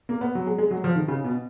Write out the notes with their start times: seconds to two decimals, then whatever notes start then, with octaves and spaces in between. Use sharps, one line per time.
0.09 A#3
0.21 B3
0.35 F#3
0.47 G#3
0.58 G#3
0.71 F#3
0.84 F3
0.96 D#3
1.08 C#3
1.24 B2